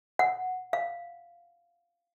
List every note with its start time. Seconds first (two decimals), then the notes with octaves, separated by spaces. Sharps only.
0.19 F#5
0.73 F5